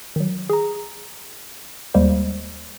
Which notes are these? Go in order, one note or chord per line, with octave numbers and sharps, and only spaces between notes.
D#3 F#3
G#4 A#5
D#2 G3 G#3 A#3 C5